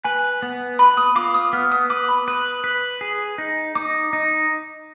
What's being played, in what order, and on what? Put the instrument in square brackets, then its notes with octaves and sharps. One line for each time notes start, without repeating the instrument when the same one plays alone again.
[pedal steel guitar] B4 [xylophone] G#5
[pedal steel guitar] B3
[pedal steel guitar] B4 [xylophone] B5
[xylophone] D#6
[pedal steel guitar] F4 [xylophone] D6
[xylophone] D#6
[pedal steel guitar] B3 [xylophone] F6
[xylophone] D#6
[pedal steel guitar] B4 [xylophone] D6
[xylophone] B5
[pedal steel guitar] B4 [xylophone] D#6
[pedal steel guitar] B4
G#4
D#4
[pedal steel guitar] D#4 [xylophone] D6
[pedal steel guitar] D#4